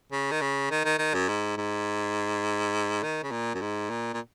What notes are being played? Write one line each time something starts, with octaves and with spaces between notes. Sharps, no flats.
C#3
D#3
C#3
D#3
D#3
D#3
F#2
G#2
G#2
D#3
C#3
A#2
F#2
G#2
A#2
A#2